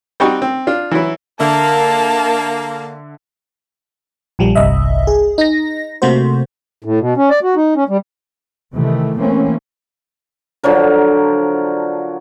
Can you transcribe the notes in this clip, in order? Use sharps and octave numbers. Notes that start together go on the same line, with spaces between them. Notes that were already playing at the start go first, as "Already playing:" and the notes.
G3 C4 D#4 F#4 G5 C#6
C4
D4 F4
E3 F#3 E4
D3 A#3 E5 A5
A#1 F3 G3
G1 C2 D#5 E5
G#4
D#4 A#6
C3 A3 A#3 F#4 C5
A2
B2
C#4
D5
F#4
D#4
C#4
G3
C3 D#3 E3 A3
E3 A3 A#3 C4 C#4
D3 F3 F#3 A#4